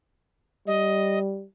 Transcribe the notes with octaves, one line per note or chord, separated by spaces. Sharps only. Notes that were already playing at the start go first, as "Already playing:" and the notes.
G3 D#5